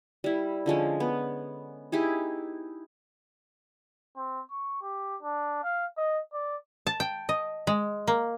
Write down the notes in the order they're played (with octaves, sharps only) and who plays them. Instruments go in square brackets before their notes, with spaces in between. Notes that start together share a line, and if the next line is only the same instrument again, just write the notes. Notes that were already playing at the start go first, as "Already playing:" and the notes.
[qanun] G3 E4
D3 F3 G#3 C#4
B3
D#4 E4 G4 G#4
[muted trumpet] C4
C#6
G4
D4
F5
D#5
D5
[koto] A5
G5
D#5
G#3
A#3